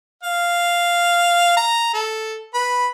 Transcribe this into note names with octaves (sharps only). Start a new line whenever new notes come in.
F5
A#5
A4
B4 B5